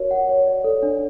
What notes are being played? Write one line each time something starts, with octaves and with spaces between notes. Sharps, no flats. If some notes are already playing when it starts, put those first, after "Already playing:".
Already playing: F#4 A#4 C#5
F#5
C#5
D5
A4
D4